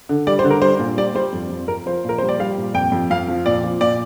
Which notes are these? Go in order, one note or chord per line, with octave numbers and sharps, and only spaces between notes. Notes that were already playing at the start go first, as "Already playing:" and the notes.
D3
G3 D5
C5
D3
A#4
G3 C5
A#2
G3 D5
G3 C5
F2
F2
F2 A#4
F3 C5
A#2 A#4
G3 C5
D5
G3 F5
A#2
F2 G5
F2
F2 F5
F3
A#2 D5
F3
A#2 D5